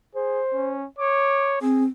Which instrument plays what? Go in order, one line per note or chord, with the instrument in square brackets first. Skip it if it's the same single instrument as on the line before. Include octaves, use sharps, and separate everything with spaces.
[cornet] G#4 [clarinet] C5
[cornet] C#4
[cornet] C#5 [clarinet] D6
[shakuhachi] C4 [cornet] G#4